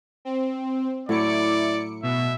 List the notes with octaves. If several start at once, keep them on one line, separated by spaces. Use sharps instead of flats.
C4
A2 F#3 E4 C#5 D5 D6 C#7
B2 E5